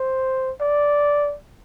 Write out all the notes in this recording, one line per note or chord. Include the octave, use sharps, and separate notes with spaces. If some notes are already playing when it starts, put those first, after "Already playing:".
Already playing: C5
D5